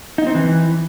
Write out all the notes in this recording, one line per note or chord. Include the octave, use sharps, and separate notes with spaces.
D#4
C4
E3